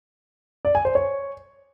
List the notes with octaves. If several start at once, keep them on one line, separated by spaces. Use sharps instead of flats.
D5
G#5
C5
C#5